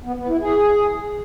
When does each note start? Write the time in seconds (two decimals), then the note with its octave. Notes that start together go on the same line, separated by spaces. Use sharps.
0.05 B3
0.17 B3
0.28 E4
0.40 G#4